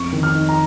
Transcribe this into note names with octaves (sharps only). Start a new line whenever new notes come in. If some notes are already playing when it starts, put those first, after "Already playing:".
Already playing: F2 C#6
D#3
F6
D#4
A#5